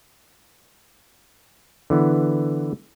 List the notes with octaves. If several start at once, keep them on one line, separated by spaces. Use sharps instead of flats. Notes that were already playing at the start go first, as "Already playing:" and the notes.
D3 E3 B3